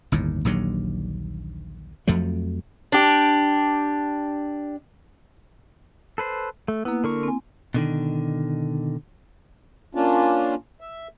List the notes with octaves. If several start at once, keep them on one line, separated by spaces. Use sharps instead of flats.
G1 D#2 A2
A#1 D#2 D3 F#3
F2 F3 F#3 A3
D4 G4
A4 B4 C5
A3
A#3 B3 E4
D3 A#4 C#6
C4 G#5
B2 D3 D#3
A#3 C#4 D4 F4
E5